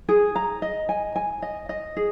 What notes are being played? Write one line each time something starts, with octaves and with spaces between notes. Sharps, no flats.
G#4
A#5
D#5
G#5
G#5
D#5
D#5
G#4